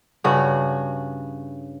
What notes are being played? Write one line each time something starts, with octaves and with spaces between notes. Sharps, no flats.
G2 C#3 F#4